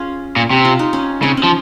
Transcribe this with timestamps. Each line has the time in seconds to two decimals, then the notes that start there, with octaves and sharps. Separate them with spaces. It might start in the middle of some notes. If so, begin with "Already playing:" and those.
Already playing: C#4 F4 G#4
0.36 A#2
0.51 C3
0.65 F4
0.79 D#4
0.93 C#4
1.22 C#3 C4
1.37 C#4
1.43 F3